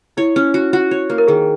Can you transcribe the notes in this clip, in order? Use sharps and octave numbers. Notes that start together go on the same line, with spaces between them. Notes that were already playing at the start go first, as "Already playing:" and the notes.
E4 C#5
C#4
F#4
F#4
C#5
A#3
A#4
D#3 G#4